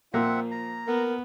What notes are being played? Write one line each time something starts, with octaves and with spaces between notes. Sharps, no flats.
A#2 F3 A#3 C4 E5 F#5
A#5
B3 A#4